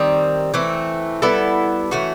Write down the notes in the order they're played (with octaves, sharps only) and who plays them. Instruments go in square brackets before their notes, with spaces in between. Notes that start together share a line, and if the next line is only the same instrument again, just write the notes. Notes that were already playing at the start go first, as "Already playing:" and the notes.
Already playing: [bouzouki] D#3 G3 C4
E3 A3 C4
G3 B3 E4 A4
E3 A3 C#4 F#4